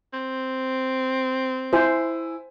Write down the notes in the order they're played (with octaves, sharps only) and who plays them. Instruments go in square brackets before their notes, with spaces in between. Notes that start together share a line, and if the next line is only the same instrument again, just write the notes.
[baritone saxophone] C4
[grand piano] E4 E5 G#5 [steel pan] C5